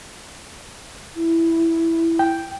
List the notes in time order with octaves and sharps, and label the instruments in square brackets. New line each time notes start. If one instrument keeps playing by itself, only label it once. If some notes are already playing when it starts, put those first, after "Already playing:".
[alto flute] E4
[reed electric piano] G5